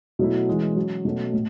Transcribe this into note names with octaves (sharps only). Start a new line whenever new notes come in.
B2 F#3 A3 E4
E3 G#3 C#4
F#3 C#4 F#4
B2 F#3 A3 C#4
A2